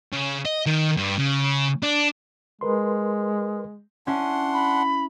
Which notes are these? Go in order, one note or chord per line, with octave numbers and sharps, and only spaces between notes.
C#3
D#5
D#3
G2
C#3
D4
G#3 A#4 B4 C6
C#4 D4 E4 F#5 C6
B5